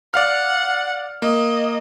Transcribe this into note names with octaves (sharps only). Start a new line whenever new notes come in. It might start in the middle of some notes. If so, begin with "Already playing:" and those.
D5 F5 F#5 F6
A#3 D#5